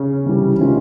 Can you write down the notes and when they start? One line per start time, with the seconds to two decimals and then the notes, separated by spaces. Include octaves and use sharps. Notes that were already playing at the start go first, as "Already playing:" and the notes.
Already playing: C#3 C#4
0.25 C2 C3 E3 G3
0.58 C3 D#3 G#3 C#4 F4